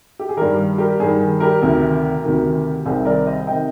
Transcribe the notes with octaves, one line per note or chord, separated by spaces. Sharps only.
G4
G#4
G2 D#3 G4 A#4
G4 A#4
G2 D#3 G#4
G#4
G4 A#4
D2 C3 D#3
D2 C3 D#3
C2 C3 D#3 G#4 C5
A#4 D5
C5 D#5
C3 D#3 D#5 G5